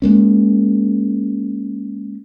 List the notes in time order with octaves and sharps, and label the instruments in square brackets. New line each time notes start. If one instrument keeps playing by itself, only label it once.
[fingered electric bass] G#3 A#3 C#4